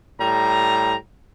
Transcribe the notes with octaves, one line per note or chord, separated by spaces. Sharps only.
A2 G3 A#5